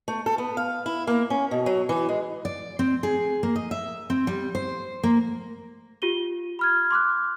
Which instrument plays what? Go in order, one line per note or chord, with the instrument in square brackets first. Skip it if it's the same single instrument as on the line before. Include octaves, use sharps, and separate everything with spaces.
[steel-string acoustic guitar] A3
A4
B3
F5
E4
A#3
C#4
B2
F#3
E3
G#3
D5
C4
G#4
A#3
D#5
E5
C4
G3
C5
A#3
[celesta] F4 G4 D#7 G7
B5 F6 G#6
C6 D6 F6 F#6